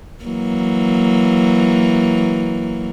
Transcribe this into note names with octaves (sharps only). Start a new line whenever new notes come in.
E3 F#3 A#3